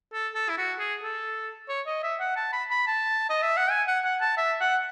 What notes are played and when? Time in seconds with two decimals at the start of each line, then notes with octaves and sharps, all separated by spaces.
0.13 A4
0.35 A4
0.49 E4
0.58 F#4
0.80 G#4
1.03 A4
1.69 C#5
1.87 D#5
2.03 E5
2.20 F#5
2.37 A5
2.53 B5
2.71 B5
2.87 A5
3.30 D#5
3.43 E5
3.57 F#5
3.71 G#5
3.88 F#5
4.04 F#5
4.21 A5
4.38 E5
4.61 F#5